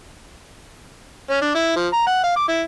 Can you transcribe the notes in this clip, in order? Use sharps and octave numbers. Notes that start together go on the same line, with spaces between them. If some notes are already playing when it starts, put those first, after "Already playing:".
C#4
D4
E4
F3
A#5
F#5
F5
D6
E4